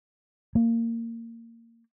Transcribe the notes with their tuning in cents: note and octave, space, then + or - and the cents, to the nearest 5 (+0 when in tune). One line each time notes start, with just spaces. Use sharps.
A#3 -20